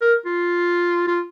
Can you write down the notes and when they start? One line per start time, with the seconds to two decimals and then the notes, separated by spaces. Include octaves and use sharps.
0.01 A#4
0.25 F4
1.07 F4